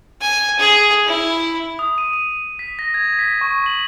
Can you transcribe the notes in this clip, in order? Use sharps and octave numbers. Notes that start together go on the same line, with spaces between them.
G#5
G#4
E4
D#6
D#7
D#7
B6
A#6
G#6
B6
C#6
F#7